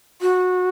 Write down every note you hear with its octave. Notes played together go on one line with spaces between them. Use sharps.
F#4